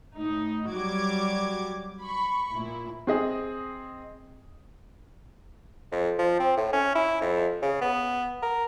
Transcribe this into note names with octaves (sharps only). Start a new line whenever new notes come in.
A2 D#4
F#3 G3 F#4 D6 G#6
B5 C#6
A#2 E4
C4 G#4 D#5
F2
F3
C4
A2
C#4
E4
F2
C#3
B3
A#4